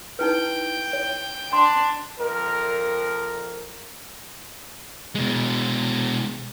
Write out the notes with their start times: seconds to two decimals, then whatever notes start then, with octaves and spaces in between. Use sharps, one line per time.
0.19 D#4 E4 B4 G5
0.93 C#5
1.53 D4 C6
2.19 F2 A#4
5.15 B2 G#3